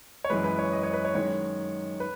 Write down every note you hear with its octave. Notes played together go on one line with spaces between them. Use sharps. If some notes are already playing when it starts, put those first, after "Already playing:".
C#5
F#2 E3 G#3 B4
B4
C#5
D#5
C#5
B4
C#5
F#2 D#3 G#3 C#5
B4